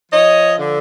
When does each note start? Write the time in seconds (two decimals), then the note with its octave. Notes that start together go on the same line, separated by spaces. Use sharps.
0.12 F3 C#5 D#5
0.59 D3